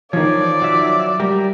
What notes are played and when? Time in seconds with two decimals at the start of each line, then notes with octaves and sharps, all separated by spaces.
0.13 D#3 F3 C#5 D5
0.62 F#3 E5
1.20 G3 G4 A#4